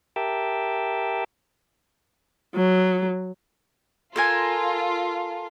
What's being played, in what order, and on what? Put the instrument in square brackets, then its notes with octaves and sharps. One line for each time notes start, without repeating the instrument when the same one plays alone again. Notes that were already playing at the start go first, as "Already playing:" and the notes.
[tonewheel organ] G4 A#4 E5 G5 A5
[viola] F#3
[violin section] F4 [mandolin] A4 A#4 G#5